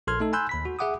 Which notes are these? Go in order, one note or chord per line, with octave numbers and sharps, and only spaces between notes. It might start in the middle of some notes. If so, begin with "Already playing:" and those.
A#1 A4 C6 F6 G#6
A3 D#4 A4
G#5 B5 C6 E6 F#6 G6
D#2 B5 B6
F#4
G#4 E5 F#5 D6 D#6